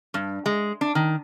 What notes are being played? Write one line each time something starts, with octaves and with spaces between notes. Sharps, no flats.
G2
G#3
D4
D#3